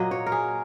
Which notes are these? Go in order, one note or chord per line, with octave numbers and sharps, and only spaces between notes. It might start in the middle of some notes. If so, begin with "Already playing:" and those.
Already playing: A#2 F#3 A#3 D#5
C#5
A#4
G#4